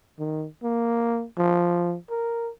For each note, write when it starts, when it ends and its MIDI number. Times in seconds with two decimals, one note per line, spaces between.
0.19 0.46 51
0.63 1.25 58
1.38 1.96 53
2.10 2.50 70